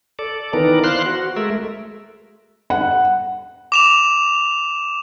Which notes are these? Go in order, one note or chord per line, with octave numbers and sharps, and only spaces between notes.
A4 D5
D#3 E3 B3 A#4 D5
C5 F5 C6 F#6
F#4
G#3 A3 A#4 E5
F#5
D6 E7 F7